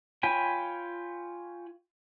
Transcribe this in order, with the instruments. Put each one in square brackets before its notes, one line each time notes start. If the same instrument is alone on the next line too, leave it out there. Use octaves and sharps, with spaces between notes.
[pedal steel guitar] F4 C#5 G5 G#5 B5